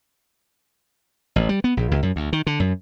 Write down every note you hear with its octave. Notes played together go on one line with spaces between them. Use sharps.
A1
G3
B3
A#1
C#2
F#2
D2
D#3
D3
F#2